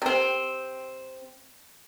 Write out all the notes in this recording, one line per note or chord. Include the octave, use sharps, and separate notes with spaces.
C3 C4